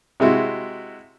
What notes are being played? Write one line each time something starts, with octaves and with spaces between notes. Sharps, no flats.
C3 G#3 E4 F#4